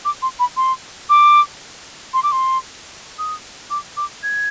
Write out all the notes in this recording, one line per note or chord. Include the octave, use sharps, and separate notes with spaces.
D6
C6
B5
C6
D6
C6
D6
C6
D#6
D6
D6
G#6